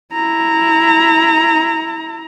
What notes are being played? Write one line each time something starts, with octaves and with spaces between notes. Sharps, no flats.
E4 A#5